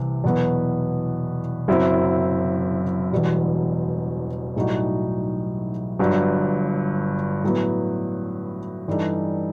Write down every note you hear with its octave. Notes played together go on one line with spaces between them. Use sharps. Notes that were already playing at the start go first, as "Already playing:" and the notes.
Already playing: C2 C3 E3
E2 B2 F#3 B3
F#1 F#2 F#3 C4 E4
E1 E2 B2 G3
B1 A2 G3 D#4 F#4
G1 G2 F#3
A2 F#3 B3
G2 E3 G3 D#4 A4